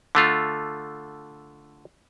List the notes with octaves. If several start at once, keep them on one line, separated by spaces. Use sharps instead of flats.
D3 A3 F4